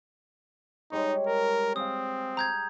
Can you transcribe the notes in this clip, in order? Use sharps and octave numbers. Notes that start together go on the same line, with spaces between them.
G3 G#3 D#4 C#5
A#4
C4 F5 G#5 D#6
A#5 G6 G#6